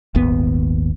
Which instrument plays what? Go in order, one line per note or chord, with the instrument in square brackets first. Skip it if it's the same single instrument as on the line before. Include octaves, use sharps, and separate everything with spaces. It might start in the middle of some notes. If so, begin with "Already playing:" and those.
[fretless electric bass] D#1 G#1 D#2 B3